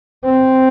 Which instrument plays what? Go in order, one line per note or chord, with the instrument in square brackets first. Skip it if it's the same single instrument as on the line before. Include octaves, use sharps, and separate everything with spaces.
[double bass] C4